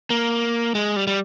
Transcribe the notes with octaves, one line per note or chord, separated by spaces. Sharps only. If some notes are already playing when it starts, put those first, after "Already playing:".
A#3
G#3
G3
G3